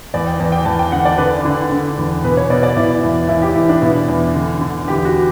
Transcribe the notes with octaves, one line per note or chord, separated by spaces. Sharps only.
E2 D5
G5
E2
G5
E2 A5
G5
D3 F#5
D5
D3 B4
D3
D3
E2
B2 B4
C#5
B2 D5
D5
B2 E4
E2
E2 E4
G4
E2 E4
D4
B2 E4
E2
D3
D3
E2 G4
G4
F#4